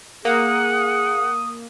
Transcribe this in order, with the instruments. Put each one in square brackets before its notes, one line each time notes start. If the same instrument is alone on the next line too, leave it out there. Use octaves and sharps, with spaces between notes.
[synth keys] A#3 [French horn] G#4 [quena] F#5 [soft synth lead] D#6